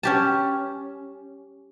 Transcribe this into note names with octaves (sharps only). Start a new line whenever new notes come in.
C#4 G4 A5